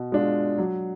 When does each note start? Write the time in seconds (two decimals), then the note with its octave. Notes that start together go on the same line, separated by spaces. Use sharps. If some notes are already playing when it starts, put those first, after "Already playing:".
Already playing: B2
0.12 G#3 D4 F4
0.58 F#3